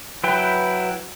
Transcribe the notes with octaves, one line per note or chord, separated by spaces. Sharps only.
F#3 E4 B4 G5